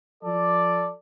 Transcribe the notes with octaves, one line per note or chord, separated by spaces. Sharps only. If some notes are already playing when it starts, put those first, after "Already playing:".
F3 A4 D5